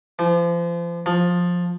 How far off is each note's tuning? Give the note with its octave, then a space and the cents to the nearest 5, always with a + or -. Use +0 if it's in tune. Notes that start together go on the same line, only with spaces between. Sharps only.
F3 -35
F3 +15